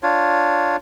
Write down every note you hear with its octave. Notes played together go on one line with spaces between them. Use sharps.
D4 F4 C#5